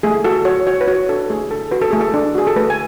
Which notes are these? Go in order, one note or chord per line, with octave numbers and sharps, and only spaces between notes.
A3 G#4
F#4 A4
F#4 C#5
F#4 C#5
B4
F#4 C#5
D4 A4
A3 G#4
D4 A4
F#4 B4
A4
A3 G#4
A4
D4
F#4 G#4
A4
A3 B4
G#5